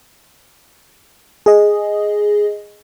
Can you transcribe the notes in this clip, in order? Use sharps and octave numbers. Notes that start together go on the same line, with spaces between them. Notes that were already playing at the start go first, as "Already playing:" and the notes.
G#4 D#5